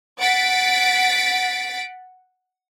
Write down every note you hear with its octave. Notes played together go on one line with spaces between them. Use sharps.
F#5 A6 B6 D7